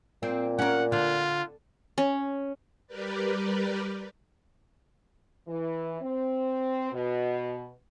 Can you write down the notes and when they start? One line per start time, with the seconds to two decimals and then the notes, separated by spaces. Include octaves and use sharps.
0.23 A#2 C4
0.59 C#4 A#4 F#5
0.92 D3 F4
1.98 C#4
2.87 G3 G4 A#4 B4 D5
5.46 E3
6.01 C4
6.92 B2